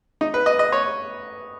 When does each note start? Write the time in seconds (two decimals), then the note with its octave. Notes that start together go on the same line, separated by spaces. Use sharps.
0.21 D#4
0.34 B4
0.46 D#5
0.59 D#5
0.72 C#5